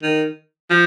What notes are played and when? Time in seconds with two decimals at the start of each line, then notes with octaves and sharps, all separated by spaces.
0.02 D#3
0.70 F3